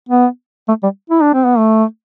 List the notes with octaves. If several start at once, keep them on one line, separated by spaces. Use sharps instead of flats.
B3
A3
G3
E4
D4
C4
B3
A3